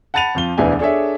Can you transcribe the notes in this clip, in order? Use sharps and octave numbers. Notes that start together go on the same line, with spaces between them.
F#5 A5 B5 A6 D#7 F7
F2 F3 G7
E1 D2 E3 D4 G#5
D4 G#4 A4 C#5 D5 E5